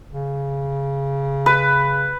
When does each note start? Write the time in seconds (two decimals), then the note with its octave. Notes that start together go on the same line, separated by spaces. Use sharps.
0.10 C#3
1.46 B4